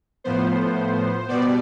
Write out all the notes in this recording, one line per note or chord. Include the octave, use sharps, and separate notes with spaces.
A2 F3 B3 C5
B2 G3 B3 D5